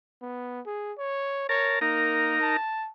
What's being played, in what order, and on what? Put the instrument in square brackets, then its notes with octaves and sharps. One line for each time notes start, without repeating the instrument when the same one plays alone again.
[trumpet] B3
G#4
C#5
[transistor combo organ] A#4 A5 [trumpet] C#5
[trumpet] A#3 [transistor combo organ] D#4 A#4
[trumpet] A5